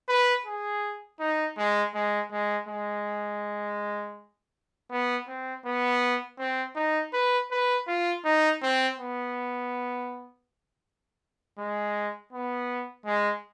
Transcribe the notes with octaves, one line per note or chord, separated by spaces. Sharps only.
B4
G#4
D#4
G#3
G#3
G#3
G#3
B3
C4
B3
C4
D#4
B4
B4
F4
D#4
C4
B3
G#3
B3
G#3